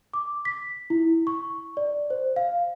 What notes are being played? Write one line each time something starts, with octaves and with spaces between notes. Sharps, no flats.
D6
B6
E4
C#6
D5
C5
F5